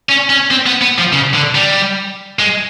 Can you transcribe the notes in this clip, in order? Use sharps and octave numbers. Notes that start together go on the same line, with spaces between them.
C#4
C#4
C4
B3
B3
F3
C#3
D3
G3
G#3